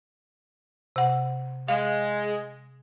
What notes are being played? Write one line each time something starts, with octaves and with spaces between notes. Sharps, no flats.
C3 F#5
G#3 F5